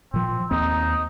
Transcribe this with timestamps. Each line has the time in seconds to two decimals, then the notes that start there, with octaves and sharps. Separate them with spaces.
0.14 A#2 F3 C4
0.51 D#2 A#3 C4 D#4